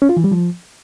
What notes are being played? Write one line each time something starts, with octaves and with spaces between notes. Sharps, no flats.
C#4
F4
E3
G3
F3